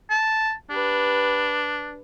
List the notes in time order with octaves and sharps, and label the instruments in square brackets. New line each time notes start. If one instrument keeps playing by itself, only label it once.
[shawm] A5
[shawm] D4 [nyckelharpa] G4 B4